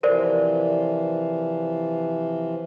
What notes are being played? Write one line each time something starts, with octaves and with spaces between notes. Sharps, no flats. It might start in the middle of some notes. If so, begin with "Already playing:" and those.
C3 E3 F3 A#4 C5 D5